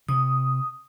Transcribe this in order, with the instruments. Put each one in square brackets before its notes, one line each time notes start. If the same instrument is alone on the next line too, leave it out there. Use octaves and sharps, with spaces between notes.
[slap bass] C3 [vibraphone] D#6